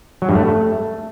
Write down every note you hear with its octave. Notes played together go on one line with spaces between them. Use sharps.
F#3
G2
A3